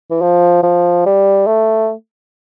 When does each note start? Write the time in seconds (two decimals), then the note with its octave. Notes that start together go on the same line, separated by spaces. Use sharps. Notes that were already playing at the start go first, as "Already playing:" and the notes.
0.10 E3
0.21 F3
0.63 F3
1.06 G3
1.47 A3